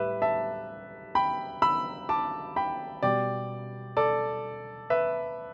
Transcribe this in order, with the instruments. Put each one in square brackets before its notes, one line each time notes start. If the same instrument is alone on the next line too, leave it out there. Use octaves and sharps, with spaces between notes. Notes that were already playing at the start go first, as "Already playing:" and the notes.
Already playing: [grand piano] A2 G3 G4 B4 E5
E5 A5
G5 B5
B5 E6
A5 D6
G5 B5
B2 G3 D5 G5
A4 D5
B4 E5